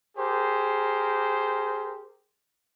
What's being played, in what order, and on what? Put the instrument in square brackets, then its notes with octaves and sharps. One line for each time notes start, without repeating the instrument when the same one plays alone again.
[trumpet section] G4 G#4 A#4 C5